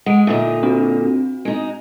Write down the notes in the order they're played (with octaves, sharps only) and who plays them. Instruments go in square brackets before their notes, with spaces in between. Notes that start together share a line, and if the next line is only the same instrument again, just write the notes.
[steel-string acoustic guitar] G#3 [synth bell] F#5 D7
[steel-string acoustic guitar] A#2 D3 D#4 [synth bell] E5
[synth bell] C4 D4 F#4
[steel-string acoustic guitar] G#3 D#4